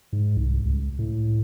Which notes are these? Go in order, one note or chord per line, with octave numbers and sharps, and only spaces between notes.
G#2
C2
C#2
A2